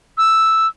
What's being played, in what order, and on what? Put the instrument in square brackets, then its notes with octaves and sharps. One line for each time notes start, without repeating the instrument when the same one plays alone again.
[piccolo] E6